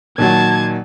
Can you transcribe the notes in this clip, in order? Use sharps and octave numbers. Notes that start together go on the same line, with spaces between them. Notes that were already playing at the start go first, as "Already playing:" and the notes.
A#2 D#3 F#3 A5 G#6